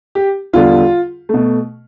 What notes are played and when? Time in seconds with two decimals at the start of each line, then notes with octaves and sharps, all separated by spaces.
0.15 G4
0.53 E2 D3 G3 F4
1.29 B2 A3